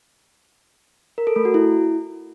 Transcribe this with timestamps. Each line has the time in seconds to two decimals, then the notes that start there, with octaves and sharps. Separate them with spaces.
1.18 A#4
1.27 A4
1.36 A3
1.45 F#4
1.54 E4